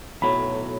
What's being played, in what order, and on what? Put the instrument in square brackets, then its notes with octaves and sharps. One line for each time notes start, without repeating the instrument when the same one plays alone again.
[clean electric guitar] B1 A2 F#3 [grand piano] B5